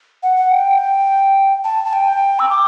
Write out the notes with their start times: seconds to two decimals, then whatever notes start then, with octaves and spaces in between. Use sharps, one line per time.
0.23 F#5
0.37 F#5
0.51 G5
1.64 A5
1.85 A5
1.93 G5
2.39 E6
2.50 D6